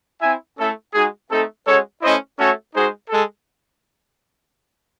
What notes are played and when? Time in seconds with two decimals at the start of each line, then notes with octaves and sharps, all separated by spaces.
0.21 C4 E4 E5 G#5
0.57 A3 C#4 E4 A4
0.93 G#3 D#4 F#4 G#4
1.30 A3 C4 D#4 A4
1.65 G#3 C#4 F#4 A4 C#5
2.01 A3 C#4 E4 C5 D#5
2.38 A3 C#4 F#4 A4 C#5
2.74 G#3 D#4 F#4 G#4 C5
3.10 G#3 A4